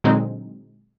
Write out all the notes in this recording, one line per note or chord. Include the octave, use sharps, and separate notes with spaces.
A#2 D3 F#3 G#3 C4 D#4